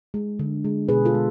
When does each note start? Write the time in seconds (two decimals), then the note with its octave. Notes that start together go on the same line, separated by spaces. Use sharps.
0.14 G#3
0.39 D3
0.64 G#3
0.88 B2 G#4 B4
1.05 F4 A4
1.14 G#3